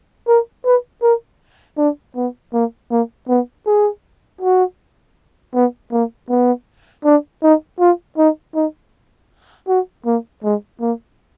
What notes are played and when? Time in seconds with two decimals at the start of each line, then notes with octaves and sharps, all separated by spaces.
0.28 A#4
0.65 B4
1.02 A#4
1.78 D4
2.16 B3
2.53 A#3
2.91 A#3
3.29 B3
3.66 G#4
4.41 F#4
5.54 B3
5.92 A#3
6.29 B3
7.05 D4
7.43 D#4
7.80 F4
8.18 D#4
8.55 D#4
9.68 F#4
10.06 A#3
10.44 G#3
10.81 A#3